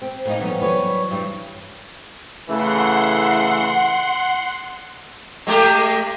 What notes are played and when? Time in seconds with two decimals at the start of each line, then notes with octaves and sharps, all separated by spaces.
0.02 C4 G4
0.26 A2 A#3 D#4
0.40 E3 F#3 G3 B3 C#4
0.61 B4 C#5
1.11 G2 E3
2.49 C#3 E3 A3 F#5 C6
5.47 G#3 A3 G4